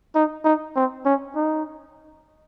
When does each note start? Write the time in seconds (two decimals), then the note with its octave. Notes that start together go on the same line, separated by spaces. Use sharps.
0.15 D#4
0.44 D#4
0.76 C4
1.05 C#4
1.36 D#4